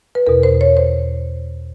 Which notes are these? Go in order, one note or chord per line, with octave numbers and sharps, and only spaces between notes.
B4
E2 B2 A#4
C5
C#5
C5